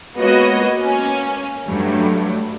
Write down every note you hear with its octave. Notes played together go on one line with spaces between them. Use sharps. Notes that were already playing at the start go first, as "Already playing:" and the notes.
G#3 A#3 B3 F#4 C#5 D#5
A#3 C#4
G2 F#3 G3 A3